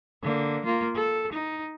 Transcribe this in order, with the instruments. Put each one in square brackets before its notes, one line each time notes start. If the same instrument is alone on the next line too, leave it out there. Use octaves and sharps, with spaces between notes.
[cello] D3 A#3
A#3 F4
A4
D#4